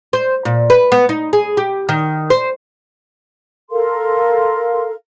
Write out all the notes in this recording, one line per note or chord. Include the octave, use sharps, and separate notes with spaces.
C5
A#2
B4
B3
D#4
G#4
G4
D#3
C5
A4 A#4 F5 C6